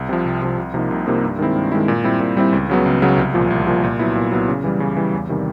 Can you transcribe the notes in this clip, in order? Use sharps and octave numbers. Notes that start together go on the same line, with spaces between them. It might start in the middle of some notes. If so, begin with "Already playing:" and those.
Already playing: C2
C3 F3
C2
C3 F3
C2
C3 F3 A#3 D#4
C2
C3 F3 A#3 D#4
G2
D#3 G#3 C4 E4
G2
D#3 G#3 C4 E4
A#2
G3 C4 E4
A#2
G3 C4 E4
C#2
C#3 F#3 B3
C#2
C#3 F#3 B3
C2
A#2 F3
C2
A#2 F3
A#2
F#3 B3 E4
A#2
F#3 B3 E4
C#3
E3 G3
C#3
E3 G3
E2
C3 D#3 G3